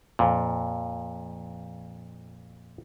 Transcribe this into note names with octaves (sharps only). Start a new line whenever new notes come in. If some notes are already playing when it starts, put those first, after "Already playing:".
F2 A#2